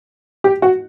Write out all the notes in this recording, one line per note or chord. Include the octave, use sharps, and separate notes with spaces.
G4
F#4